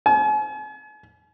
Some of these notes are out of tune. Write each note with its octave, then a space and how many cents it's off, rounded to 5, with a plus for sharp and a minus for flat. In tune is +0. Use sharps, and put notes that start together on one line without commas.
G#5 +45